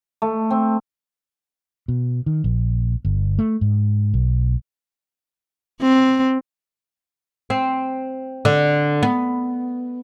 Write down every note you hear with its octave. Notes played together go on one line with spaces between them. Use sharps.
A3
C4
B2
D#3
A#1
G1
A3
G#2
B1
C4
C4
D3
B3